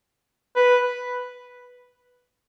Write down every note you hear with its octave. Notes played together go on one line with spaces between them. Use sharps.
B4